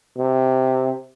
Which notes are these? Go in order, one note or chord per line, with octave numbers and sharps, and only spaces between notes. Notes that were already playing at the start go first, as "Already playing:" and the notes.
C3